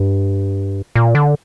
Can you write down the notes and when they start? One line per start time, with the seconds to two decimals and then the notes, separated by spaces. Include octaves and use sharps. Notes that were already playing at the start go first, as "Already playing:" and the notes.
Already playing: G2
0.95 A#2
1.15 D3